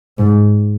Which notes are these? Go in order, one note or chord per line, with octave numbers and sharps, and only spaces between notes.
G#2